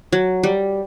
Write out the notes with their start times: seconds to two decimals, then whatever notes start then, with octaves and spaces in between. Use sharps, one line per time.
0.12 F#3
0.43 G3